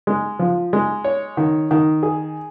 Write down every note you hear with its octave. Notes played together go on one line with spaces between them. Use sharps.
G#3
F3
G#3
C#5
D#3
D#3
G#4